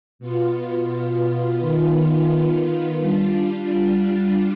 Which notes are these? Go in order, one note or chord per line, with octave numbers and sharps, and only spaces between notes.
B2 B3 F4
D#3 B3 F4
G3 D4 F4